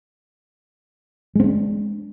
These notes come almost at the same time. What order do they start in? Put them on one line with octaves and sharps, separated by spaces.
G#3 C4 D4